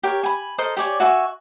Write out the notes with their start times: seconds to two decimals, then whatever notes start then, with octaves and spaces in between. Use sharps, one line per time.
0.03 G4 A#4 C#5
0.23 G#5 B5
0.58 A4 A#4 C5 D#5
0.77 G4 C#5 D5 G#5
1.00 F#4 E5 G#5 C#6